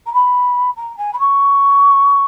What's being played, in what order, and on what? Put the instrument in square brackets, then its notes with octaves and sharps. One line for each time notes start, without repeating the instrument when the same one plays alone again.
[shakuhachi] A#5
B5
A#5
G#5
B5
C#6